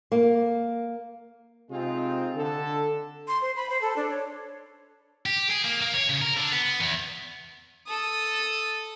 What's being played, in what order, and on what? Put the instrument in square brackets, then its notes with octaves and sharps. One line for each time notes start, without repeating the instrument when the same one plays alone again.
[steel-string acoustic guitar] A#3
[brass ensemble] C3 G#3 C4 D#4 F4
D3 A4
[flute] C6
C5
B5
C5
A4
D4
C#5
[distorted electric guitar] G4
G#4
A#3
A#3
C#5
C#3
A#4
D3
B3
E2
[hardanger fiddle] A4 D#6